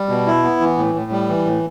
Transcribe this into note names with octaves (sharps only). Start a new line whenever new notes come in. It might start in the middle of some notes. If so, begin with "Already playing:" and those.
Already playing: G3
B2
E4
B3
E3
A2
A2
G3
E3
A2